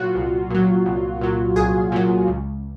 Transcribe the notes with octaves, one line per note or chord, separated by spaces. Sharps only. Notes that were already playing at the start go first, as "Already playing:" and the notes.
Already playing: A#2 F#3 F4 F#4
C2
A#2 F#3
C2
A#2 F#3
C2 G#4
A#2 F#3
C#2